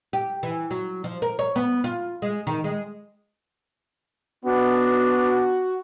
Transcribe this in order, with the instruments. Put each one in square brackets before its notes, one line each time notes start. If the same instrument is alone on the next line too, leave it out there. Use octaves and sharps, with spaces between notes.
[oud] G4
E3
F#3
F3
A#4
C#5
B3
F4
G#3
D#3
G#3
[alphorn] B3 [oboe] D4 [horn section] F#4